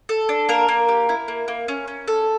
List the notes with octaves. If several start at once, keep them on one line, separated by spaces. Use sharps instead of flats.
A4
D4
A#3 A#4
A#3
G4
E4
A#3
A#3
C#4
C#4
A4